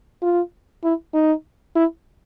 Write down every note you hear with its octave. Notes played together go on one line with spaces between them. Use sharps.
F4
E4
D#4
E4